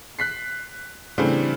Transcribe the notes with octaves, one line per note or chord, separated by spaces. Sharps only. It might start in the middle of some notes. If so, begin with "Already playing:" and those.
F#6 B6 C7
C#3 E3 G3 A3 C4 D4